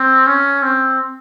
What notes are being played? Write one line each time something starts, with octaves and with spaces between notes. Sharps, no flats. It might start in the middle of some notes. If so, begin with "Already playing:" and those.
Already playing: C4
C#4
C4